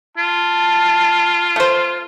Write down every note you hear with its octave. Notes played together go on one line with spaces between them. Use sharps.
F4 A5
A3 C5